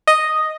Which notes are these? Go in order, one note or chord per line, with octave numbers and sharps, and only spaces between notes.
D#5